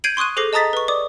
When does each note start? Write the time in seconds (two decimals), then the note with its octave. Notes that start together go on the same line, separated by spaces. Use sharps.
0.04 G6 G#6 C7 D7 D#7 F#7
0.17 C6 C#6 D#6 F#6 D#7
0.37 G#4 A4 C5 D6 A#6 C7
0.53 D#5 A5 A#5 D#6 A6 B6
0.73 B4 C#6
0.88 D5 D6 D#6